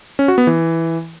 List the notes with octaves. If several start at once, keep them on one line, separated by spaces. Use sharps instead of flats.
C#4
F#4
B3
E3